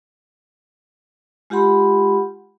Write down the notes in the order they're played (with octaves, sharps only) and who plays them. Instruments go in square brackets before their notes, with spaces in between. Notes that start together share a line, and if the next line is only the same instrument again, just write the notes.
[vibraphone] G#3 F4 G4 F#5 B5 C6